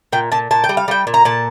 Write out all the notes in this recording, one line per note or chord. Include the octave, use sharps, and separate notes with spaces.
A#2 G5
A#2 A5
A#2 A5
G5
G3
F5
G3 G5
A#2
A#5
A#2 A5